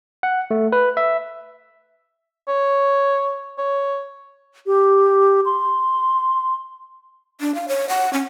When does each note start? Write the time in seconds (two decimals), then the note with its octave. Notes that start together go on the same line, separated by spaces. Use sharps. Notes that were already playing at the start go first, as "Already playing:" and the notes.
0.23 F#5
0.51 A3
0.72 B4
0.97 E5
2.48 C#5
3.58 C#5
4.66 G4
5.45 C6
7.40 D4
7.55 F5
7.68 C#5
7.89 F#5
8.13 C#4